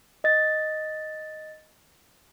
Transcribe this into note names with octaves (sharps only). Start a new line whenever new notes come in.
D#5 A6